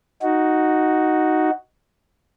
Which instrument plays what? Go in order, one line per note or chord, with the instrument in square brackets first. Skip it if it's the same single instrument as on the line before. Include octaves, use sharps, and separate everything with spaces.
[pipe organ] D#4 F#4